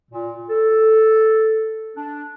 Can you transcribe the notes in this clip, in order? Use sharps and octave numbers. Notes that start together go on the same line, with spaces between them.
A#2
A4
D4